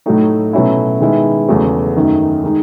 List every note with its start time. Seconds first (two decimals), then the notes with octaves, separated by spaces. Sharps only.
0.06 A2 F#3 A3 D#4
0.53 B2 F#3 A3 C#4 E4
1.00 D#3 G#3 B3 E4
1.49 E2 C#3 F#3 A3
1.96 F#2 D#3 A3 D#4
2.44 D#3 G#3 D#4